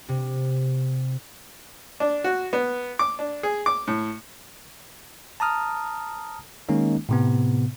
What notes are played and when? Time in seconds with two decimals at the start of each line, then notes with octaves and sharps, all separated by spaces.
0.09 C3
2.00 D4
2.24 F#4
2.53 B3
2.99 D6
3.19 D4
3.43 G#4
3.66 D6
3.87 A2
5.40 A5 A#5 D#6 F6
6.69 D#3 G#3 A#3 C#4 D#4
7.09 A2 C3 B3